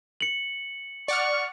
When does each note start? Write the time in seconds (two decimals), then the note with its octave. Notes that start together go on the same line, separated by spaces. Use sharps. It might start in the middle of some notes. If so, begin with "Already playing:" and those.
0.21 C#7 F#7
1.08 D5 F#5 C#6 F6